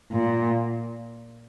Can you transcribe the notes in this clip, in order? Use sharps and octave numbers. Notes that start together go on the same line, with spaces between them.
A#2